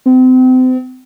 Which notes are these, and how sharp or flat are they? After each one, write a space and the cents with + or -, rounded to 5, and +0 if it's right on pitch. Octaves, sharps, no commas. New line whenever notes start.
C4 -35